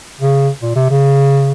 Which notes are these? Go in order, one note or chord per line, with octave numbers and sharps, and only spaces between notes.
C#3
A#2
C3
C#3